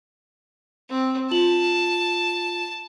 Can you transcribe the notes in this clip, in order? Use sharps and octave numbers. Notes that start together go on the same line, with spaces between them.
C4
F4 A5 F#7